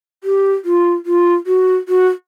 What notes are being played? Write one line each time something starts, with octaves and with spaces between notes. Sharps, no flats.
G4
F4
F4
F#4
F#4